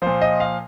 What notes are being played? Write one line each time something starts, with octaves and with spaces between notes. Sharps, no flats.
A#2 F3 C5
D#5
F5